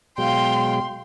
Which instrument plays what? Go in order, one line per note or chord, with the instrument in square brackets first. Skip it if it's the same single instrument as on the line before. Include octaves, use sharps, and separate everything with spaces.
[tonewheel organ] B2 F#3 G#3 [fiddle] F5 G5 [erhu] C6